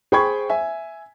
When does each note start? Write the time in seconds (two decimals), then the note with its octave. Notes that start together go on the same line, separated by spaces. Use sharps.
0.12 G#4 C5 G5 B5 C#6 G#6
0.50 E5 G#5